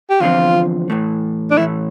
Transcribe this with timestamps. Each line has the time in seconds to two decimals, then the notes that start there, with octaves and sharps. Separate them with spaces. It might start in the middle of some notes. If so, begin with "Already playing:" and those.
0.10 G4
0.20 E2 D3 F3 C4 F4
0.90 A2 E3 A3
1.51 D4
1.57 A2 E3 A3 E4